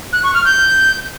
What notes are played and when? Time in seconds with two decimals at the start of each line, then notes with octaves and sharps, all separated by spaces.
0.13 F#6
0.24 C#6
0.34 F6
0.45 G6